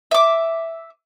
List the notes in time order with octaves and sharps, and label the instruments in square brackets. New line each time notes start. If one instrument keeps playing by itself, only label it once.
[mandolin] E5 D6